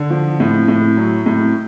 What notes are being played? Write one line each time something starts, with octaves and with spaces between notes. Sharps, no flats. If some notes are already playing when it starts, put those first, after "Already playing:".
Already playing: D3
F3
A2
A2
F#3
A2